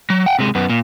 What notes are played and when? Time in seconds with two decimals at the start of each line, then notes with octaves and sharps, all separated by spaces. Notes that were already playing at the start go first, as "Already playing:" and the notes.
0.10 F#3
0.26 F#5 G5
0.39 C3 G#3
0.55 F#2 B3
0.70 A#2